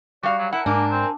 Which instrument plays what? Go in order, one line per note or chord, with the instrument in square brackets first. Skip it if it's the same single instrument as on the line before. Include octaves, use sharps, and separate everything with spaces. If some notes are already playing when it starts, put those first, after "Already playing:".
[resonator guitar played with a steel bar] G3 F5 [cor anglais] F#4 [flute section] D5 G5
[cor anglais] F#3
[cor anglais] E4 [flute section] A#4 G#5 A5 [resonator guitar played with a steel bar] F#5
[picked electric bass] G#2 [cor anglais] A#3 [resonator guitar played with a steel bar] D4
[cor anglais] C4